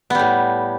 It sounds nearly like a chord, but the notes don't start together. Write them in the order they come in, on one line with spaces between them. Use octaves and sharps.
B3 G3 A2